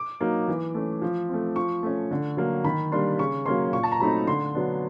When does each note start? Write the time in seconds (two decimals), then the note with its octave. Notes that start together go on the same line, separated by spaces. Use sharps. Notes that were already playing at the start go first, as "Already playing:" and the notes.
Already playing: D6
0.21 F#3 A#3 D#4
0.48 E3
0.75 A3 C#4
1.02 F3
1.29 A3 C4
1.56 F3 C#6
1.83 A3 C#4
2.11 D3
2.37 F#3 A#3
2.64 D#3 B5
2.92 G3 A#3 D4 C6
3.19 C#3 C#6
3.45 F#3 A#3 C#4 C6
3.73 A#2 C#6
3.83 A5
3.92 A#5
4.00 F#3 A3 C4 D#4 B5
4.27 D3 C6
4.55 F#3 B3 D4